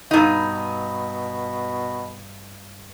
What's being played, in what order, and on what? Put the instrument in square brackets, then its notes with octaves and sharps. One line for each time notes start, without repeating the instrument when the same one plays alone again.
[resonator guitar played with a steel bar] G2 D#4 [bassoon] B2